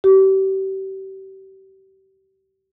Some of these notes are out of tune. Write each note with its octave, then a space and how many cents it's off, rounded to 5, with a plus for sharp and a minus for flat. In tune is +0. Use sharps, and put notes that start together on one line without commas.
G4 -35